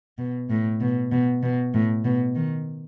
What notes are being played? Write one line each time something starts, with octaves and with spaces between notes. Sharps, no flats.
B2
A2
B2
B2
B2
A2
B2
D#3